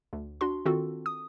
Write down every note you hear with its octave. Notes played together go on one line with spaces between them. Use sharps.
D2
D4 F#4 C6
D#3 C4 F4 F#4 A4
D#6